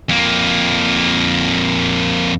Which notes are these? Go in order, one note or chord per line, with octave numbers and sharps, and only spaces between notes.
F2 A#3